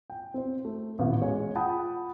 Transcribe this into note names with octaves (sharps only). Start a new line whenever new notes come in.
G5
C4 C5
A3
D#1 A1 B3 E4 F5
G#3 C#5 G#5
F4 F#5 G5 A5 B5 D#6